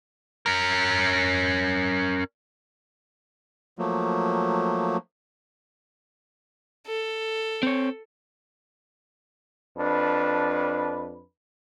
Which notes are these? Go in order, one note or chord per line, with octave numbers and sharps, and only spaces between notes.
C#4 A#4
F3 F#3 A3 A#3
A4
C4 C#5
F2 D4 B4